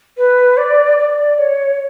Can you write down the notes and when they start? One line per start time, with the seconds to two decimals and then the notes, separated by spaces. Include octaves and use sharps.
0.17 B4
0.57 D5
0.97 D5
1.38 C#5